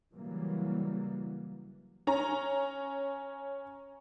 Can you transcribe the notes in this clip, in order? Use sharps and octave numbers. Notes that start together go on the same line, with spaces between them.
C#3 E3 F#3 G3 A#3
C#4 A#5